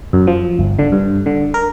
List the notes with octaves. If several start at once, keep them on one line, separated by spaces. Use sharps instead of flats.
F#2
F3
G1
D3
G2
D3
A#4